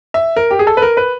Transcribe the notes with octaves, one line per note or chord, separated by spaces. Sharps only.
E5
A#4
G4
G#4
A4
B4
A#4
B4